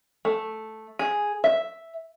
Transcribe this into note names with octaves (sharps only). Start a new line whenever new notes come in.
A3
G#4
E5